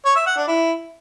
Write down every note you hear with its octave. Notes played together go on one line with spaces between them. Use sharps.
C#5
E5
F#5
D4
E4